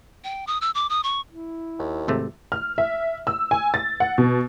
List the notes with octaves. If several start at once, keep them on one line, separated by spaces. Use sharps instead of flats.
G5
D#6
E6
D6
D#6
C#6
E4
D#2
G#1 C3 A3
F6
E5
E6
G#5
A6
F#5
B2